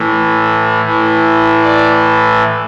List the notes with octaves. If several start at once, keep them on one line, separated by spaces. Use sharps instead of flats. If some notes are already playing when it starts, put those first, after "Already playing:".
Already playing: A2 E3
A2 E3
D5